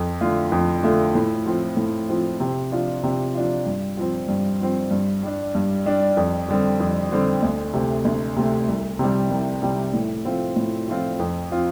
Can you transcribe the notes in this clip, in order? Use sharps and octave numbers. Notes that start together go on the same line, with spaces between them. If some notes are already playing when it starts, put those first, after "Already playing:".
Already playing: F2
D3 A3 F4
F2
D3 A3 F4
A2
F3 C4
A2
F3 C4
C3
F3 D4 F4
C3
F3 D4 F4
G2
F3 C4
G2
F3 C4
G2
G3 D4
G2
G3 D4
F2
D3 G3 C4
F2
D3 G3 C4
D2
C3 A3
D2
C3 A3
C2
C3 G3
C2
C3 G3
A2
F3 A3 C4 F4
A2
F3 A3 C4 F4
F2
F3 C4 F4